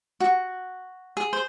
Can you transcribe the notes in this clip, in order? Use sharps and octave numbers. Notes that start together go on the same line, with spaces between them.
F#4
G#4
C5